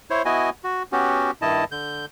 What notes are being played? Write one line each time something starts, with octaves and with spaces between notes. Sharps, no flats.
E4 C5 C#5
B3 E4 F#4 D#5 G#5
F#4
B3 C#4 F#4 G4
G2 D#3 E4 D#5 A5
D3 G6